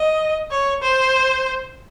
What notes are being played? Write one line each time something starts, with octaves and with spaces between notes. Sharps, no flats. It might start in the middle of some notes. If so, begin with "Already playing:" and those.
Already playing: D#5
C#5
C5